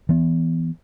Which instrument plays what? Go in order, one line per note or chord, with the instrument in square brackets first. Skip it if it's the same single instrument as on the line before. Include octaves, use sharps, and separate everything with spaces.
[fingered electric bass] E3 B3